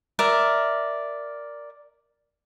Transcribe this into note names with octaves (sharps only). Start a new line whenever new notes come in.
A#4 D5 E5